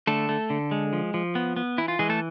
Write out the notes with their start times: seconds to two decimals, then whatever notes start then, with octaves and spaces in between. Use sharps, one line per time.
0.07 D3 A3 A4
0.29 A3
0.50 D3
0.71 G#3
0.93 F3
1.14 F3
1.35 B3
1.56 B3
1.78 E3 E4
1.88 F4
1.99 E3 G#3 G#4
2.09 A3 A4